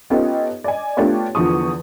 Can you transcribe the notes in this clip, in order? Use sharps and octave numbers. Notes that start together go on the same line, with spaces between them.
B3 C#4 D#4 F4 G4 A4
D5 D#5 G#5
A3 B3 D4 F4 G4 C#5
E2 D3 F3 C#6 D#6